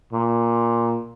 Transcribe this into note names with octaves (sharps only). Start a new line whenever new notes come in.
A#2